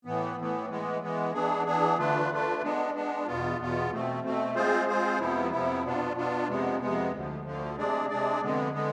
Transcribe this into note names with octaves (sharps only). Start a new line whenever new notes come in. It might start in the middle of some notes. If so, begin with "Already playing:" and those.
A2 E3 B3
A2 E3 B3
E3 G#3 B3
E3 G#3 B3
E3 B3 D4 G#4
E3 B3 D4 G#4
D3 A3 D4 F4 B4
D3 A3 D4 F4 B4
G#3 B3 D4
G#3 B3 D4
E2 B2 B3 F4
E2 B2 B3 F4
B2 A3 C4
B2 A3 C4
G#3 C4 F4 G#4 C5
G#3 C4 F4 G#4 C5
F2 C3 F3 B3 E4
F2 C3 F3 B3 E4
B2 B3 D4 F4
B2 B3 D4 F4
F2 C3 G#3 B3
F2 C3 G#3 B3
D2 D3 F3
D2 D3 F3
C3 G#3 D4 G#4 D5
C3 G#3 D4 G#4 D5
F2 D3 G#3 B3
D3 G#3 B3